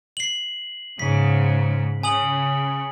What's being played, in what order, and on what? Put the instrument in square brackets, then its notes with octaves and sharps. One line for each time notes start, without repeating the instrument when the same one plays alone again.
[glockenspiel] C7 F#7
[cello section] G#2 C#3 [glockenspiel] B6
[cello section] C#3 [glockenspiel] G#5 D#6 F#7